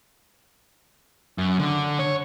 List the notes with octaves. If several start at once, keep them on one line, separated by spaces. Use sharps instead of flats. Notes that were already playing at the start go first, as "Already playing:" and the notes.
F#2
D3
C#5